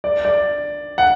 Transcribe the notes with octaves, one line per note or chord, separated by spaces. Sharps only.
D5
D5
F#5